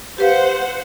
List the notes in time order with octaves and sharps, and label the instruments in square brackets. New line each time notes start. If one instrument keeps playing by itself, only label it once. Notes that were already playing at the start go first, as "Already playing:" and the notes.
[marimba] G4 B4 F5 [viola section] C5 F#5